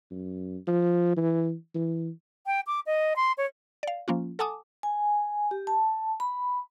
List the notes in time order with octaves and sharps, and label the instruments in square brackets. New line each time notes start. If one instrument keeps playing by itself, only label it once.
[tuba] F#2
F3
E3
E3
[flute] G5
D6
D#5
C6
C#5
[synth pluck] D5 F5
F3 A#3 C#4 F4
A4 F#5 G#5 A5 D6 D#6
[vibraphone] G#5
G4
A5
B5